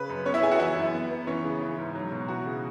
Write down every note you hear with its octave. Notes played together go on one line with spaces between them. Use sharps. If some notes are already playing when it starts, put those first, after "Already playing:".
Already playing: C#3 B4
F#2
B3 C#4 C#5
E4 E5
B3 G#4 G#5
F#4 F#5
E3 E4 E5
F#2
B3
B3
E3 C#4 C#5
C#3
E3
G#2
F#3
B2
E3 F#4
C#3